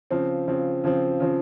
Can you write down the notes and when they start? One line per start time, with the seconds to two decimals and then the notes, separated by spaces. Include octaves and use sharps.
0.11 C#3 F3 C4
0.48 C#3 F3 C4
0.84 C#3 F3 C4
1.20 C#3 F3 C4